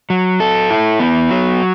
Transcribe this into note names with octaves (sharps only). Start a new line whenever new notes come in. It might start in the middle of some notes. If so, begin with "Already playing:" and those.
F#3
A4
E4
B3
F#3